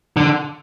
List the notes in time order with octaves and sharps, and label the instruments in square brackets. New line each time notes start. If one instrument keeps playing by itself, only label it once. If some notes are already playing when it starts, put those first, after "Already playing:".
[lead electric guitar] D3